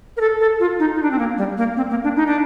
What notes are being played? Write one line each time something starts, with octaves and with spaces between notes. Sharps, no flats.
A#4
A4
A4
F4
D#4
D#4
D4
C4
A#3
G3
A#3
C4
A#3
D4
D#4
D4